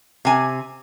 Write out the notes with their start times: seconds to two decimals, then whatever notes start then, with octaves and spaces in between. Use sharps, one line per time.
0.25 C3 G#5